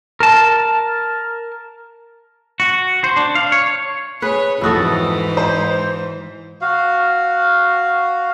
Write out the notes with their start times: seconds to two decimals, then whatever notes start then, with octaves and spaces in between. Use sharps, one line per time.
0.20 A#4 A5
2.60 F#4
3.04 C5
3.16 D4
3.35 F5
3.52 C#5
4.22 G#4 B4 C#5
4.61 F2 G#2 E3 E4 F#4 A4 D#6
5.37 C5 D#5
6.61 F#4 F5